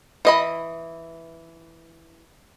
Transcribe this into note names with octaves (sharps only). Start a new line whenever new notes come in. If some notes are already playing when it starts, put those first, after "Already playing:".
E3 D#5 B5